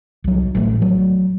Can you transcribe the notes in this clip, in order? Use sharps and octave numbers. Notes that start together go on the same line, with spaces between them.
C2 F#3
A1 G#3 A3
F#3